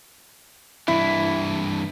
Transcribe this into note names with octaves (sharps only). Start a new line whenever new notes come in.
G2 E3 E4